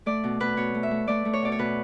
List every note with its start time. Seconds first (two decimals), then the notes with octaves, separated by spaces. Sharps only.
0.06 A3 D5
0.24 B2
0.40 B2 B4
0.57 B2 C#5
0.75 A3
0.83 E5
0.91 A3
1.08 A3 D5
1.25 A3
1.33 C#5
1.42 B2 D5
1.52 C#5
1.59 B2 B4